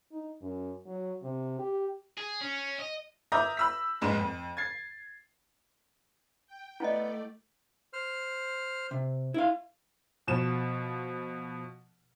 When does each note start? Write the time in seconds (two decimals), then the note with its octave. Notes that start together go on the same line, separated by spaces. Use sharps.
0.12 D#4
0.42 F#2
0.86 F#3
1.23 C3
1.59 G4
2.18 G#4
2.41 C#4
2.79 D#5
3.32 E5 A#5 D6 D#6 G6 A#6
3.57 B5 E6 B6
4.01 F1 A#1 G#2 G#3 E7
4.17 F2
4.57 G#6 A6 C7
6.47 G5
6.80 A3 B3 E4 D5 D#5
7.93 C5 F6
8.91 C3
9.34 E4 F5
10.28 B2 F3 E7